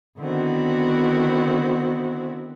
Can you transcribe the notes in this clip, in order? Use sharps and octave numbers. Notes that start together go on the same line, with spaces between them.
D3 D#3 B3 C4 E4 F#4